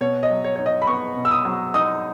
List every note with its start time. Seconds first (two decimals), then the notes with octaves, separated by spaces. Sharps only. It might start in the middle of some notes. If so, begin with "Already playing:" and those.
0.01 B2 C#5
0.23 D#5
0.30 F#3
0.44 C#5
0.56 D#4 C#5
0.66 D#5
0.82 B5
0.87 B3 C#6
1.16 B2
1.25 E6
1.31 D#6
1.45 F#3
1.74 D#4 D#6